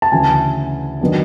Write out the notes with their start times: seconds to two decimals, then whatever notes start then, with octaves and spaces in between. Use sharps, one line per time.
0.02 A5
0.12 D2 C#3 E3 G#5
1.01 D#3 F#3 B3 D4